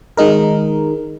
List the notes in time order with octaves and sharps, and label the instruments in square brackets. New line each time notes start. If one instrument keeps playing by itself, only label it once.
[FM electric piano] D#3 G#3 D#4 A#4